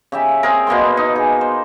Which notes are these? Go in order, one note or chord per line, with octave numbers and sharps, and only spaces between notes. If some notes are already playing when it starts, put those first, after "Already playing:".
C#3 G4 E5
C4 G#4 A#4
B2 A#3 B3 C6
D#4
G#4
C5